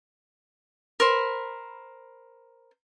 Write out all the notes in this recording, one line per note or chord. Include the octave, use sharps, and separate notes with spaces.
A#4 C5 B5